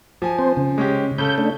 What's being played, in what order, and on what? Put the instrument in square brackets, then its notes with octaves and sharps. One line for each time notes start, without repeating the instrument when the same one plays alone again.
[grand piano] F3 G#5
[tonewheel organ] C4 C5
C#3
[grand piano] G#3 C#4 G4
[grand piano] C#3 A4 [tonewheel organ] G6
[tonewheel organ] A3 D4